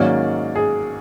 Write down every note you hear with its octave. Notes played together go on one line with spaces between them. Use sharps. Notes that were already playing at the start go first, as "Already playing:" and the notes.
Already playing: G#2 D#3 F#3 A#3 C#4 D5
G#4